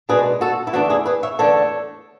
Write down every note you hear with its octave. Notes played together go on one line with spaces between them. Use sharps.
B2 G#3 D4 G#4 B4
F#4 A4
E4
E2 D3 A3 D4 F#4
E4 G#4
G#4 B4
C#5 E5
E2 D3 A3 D4 A4 C#5